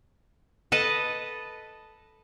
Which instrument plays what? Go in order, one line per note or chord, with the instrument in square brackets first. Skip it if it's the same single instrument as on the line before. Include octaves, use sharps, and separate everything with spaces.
[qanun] A4 B4 D#5 A5